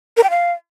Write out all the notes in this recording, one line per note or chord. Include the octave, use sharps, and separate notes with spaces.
A#4
G5
F5